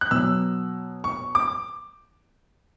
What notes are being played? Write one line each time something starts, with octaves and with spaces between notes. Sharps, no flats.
F#6
B2 F#3 E6
C#6
D6